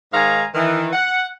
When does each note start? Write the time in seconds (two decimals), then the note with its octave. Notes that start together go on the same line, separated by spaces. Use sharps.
0.13 G#2 D#3 G#3 F5 G#5 A#5
0.55 D#3 E3
0.93 F#5